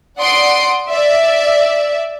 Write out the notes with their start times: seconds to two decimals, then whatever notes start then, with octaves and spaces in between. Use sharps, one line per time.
0.18 D5 F#5 C6 D#6 C7 D7
0.90 D5 E5